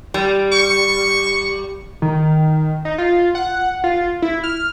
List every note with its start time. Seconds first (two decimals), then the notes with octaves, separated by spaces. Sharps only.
0.14 G3
0.53 C#6
2.02 D#3
2.85 D#4
2.98 F4
3.35 F#5
3.84 F4
4.22 E4
4.44 F6